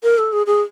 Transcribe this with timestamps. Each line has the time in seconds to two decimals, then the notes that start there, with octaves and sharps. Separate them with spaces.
0.03 A#4
0.18 A4
0.33 G#4
0.47 G#4